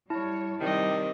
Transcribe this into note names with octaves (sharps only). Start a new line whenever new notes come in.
G3 E4 C#5 A5
C3 D#3 G3 C4 G4 D5 D#5